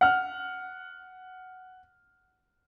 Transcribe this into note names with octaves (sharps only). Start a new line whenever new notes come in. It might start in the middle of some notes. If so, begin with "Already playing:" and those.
F#5 F6